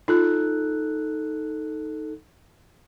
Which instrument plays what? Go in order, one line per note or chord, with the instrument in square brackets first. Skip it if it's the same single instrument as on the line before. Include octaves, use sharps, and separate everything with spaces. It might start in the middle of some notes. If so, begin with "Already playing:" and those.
[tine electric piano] D#4 A4 F#6 [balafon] F4